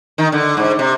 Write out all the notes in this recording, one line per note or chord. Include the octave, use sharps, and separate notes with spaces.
D#3
D3
G#2
C3